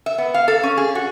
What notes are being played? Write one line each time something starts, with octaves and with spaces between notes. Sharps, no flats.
E5
B3
F5
A4
C#4
G#4
F#4